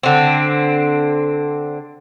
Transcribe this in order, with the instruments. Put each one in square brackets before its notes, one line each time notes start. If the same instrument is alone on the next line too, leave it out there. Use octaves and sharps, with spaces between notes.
[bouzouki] D3 C4